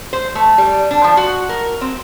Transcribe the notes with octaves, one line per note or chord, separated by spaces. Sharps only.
C5
A3
G3
D4
F3
F#4
A#4
C4